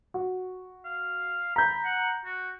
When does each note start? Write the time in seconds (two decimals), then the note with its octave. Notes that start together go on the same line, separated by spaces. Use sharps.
0.14 F#4
0.85 F5
1.56 A#5 B5 G6
1.85 F#5
2.25 F#4